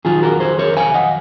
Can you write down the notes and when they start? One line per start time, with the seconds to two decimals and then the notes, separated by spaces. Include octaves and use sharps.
0.05 F2 D#3 F#3 F4 G#4
0.22 F#4 A#4
0.40 G#4 C5
0.58 A#4 C#5
0.77 F5 G#5
0.94 D#5 F#5